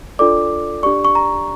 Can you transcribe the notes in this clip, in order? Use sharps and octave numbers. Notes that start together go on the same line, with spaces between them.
D4 F4 A4 D5 D6
D4 G4 D5 C#6
C#6
A#5